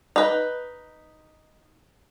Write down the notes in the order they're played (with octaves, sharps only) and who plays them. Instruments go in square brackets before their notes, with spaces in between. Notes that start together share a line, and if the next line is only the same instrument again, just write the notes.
[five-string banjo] D#4 B4